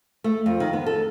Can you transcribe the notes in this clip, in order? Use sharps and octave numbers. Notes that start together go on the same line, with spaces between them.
A3
F2
D#3
B3
A4